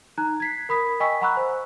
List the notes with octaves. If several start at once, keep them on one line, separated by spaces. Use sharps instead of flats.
D#4 A#5 F#6
G#6 B6 C7
A#4 B5 D#6 B6
D#5 G5 G#5 C#6 E6 B6
F#5 A#5 B5 C#6 E6 F#6
C5